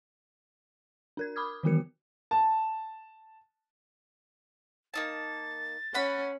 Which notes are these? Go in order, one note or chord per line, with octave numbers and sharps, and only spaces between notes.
D4 A#4 G#6
B5 D6 D#6 F6 G#6
D#3 E3 B3 F#4 A#4 C#7
A5
A#3 D#4 A5 A6
C#4 F#5 B5